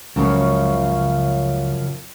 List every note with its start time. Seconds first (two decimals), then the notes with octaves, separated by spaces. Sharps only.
0.16 C#2 F#2 C#3 F3